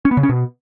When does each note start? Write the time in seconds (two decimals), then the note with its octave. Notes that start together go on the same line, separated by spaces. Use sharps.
0.05 C#4
0.11 B3
0.17 C#3
0.23 C#4
0.29 B2